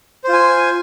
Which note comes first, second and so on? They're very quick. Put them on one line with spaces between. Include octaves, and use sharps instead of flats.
C5 F4 G#5